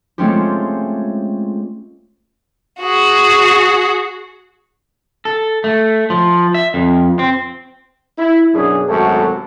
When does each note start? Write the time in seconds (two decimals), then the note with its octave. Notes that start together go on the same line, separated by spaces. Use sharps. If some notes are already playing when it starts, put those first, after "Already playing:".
0.18 G#3 A3 C4 C#4 F4 G4
2.81 F#4 G#4
5.25 A4
5.64 A3
6.10 F3
6.54 E5
6.74 F2
7.19 C4
8.18 E4
8.54 F#2 B2 D4 G#4
8.87 G#1 F#2 C3 A3 F#4 A4